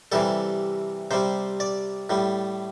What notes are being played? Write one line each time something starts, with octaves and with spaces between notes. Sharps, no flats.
C3 E3 G3 A4
C3 G3 C5
D5
A2 G3